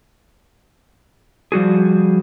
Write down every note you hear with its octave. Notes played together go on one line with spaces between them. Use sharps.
F3 G3 F#4 G#4